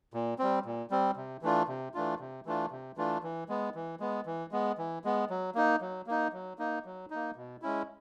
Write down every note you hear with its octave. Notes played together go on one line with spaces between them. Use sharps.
A#2
G3 C4
A#2
G3 C4
C3
E3 A3 D4 F4
C3
E3 A3 D4 F4
C3
E3 A3 D4 F4
C3
E3 A3 D4 F4
E3
G#3 B3
E3
G#3 B3
E3
G#3 B3
E3
G#3 B3
F#3
A#3 D#4
F#3
A#3 D#4
F#3
A#3 D#4
F#3
A#3 D#4
B2
G#3 C#4 E4